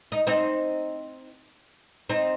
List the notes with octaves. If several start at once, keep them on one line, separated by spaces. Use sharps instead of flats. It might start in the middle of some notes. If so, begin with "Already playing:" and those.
D#4
C4 D#4
C4 D#4